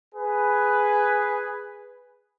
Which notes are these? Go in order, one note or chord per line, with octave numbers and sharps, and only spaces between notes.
G#4 B4